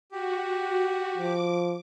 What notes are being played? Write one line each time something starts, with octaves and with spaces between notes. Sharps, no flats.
F#4 G4
F3 D6